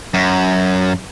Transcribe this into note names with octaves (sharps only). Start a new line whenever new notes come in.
F#2